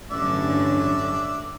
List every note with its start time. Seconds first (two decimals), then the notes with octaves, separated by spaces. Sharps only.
0.11 A1 G2 D3 F#3 C#4 D4 D5 E5